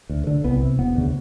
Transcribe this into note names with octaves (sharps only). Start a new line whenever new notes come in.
D2
D3
C2 B3
C3
E1 B3
D2 C#3